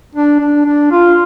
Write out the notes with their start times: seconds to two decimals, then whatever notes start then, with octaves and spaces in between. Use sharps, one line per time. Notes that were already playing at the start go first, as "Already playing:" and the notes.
0.15 D4
0.40 D4
0.65 D4
0.91 F4